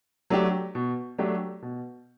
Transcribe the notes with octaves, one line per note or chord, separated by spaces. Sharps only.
F#3 A3 D4 G4
B2
F#3 A3 D4 G4
B2